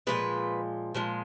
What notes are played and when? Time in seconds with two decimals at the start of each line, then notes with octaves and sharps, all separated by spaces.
0.07 A#2 F3 G#3 B4
0.95 A#2 F3 G#3